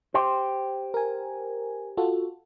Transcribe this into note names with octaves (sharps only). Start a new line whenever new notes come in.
G4 C5
A#4 G#5
F4 F#4 A4